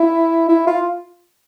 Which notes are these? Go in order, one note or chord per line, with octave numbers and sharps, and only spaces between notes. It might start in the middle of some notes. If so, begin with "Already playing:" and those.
Already playing: E4
E4
F4